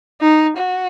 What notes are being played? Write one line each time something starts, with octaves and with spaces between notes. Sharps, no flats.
D#4
F#4